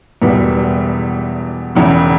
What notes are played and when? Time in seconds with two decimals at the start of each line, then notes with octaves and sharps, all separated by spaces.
0.22 E1 E2 B2 G3 B3
1.75 E1 E2 C#3